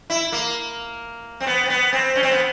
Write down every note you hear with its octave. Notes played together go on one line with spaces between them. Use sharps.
E4
A#3
C4
B3
C4
B3
C4
C#4
C4
B3